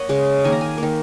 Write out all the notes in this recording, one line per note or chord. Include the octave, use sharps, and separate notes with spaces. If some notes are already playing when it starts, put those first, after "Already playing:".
Already playing: A#3 C#5 D#5 F#5
C#3 G#3
D#3 A#3 G#5
A#5
G#5
D#3 A#3